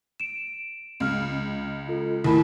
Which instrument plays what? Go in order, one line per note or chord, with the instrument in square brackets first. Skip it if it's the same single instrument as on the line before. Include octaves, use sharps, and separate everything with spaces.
[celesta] D7 E7
[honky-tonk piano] C#2 [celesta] F5 F6
[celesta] F4 A4
[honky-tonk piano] D#2 A2 [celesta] E4 A#4 B5